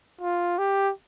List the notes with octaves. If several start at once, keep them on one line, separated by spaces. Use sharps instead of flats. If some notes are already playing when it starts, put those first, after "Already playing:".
F4
G4